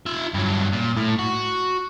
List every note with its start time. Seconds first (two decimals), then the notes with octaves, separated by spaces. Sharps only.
0.06 F4 E5
0.34 G2 F#3
0.72 A#2
0.97 A2
1.19 F#4